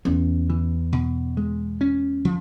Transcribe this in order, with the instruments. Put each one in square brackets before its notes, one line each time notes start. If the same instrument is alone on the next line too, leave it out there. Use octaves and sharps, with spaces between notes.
[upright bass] E2 [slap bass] C#4
[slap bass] E3
B2
G#3
C#4
F3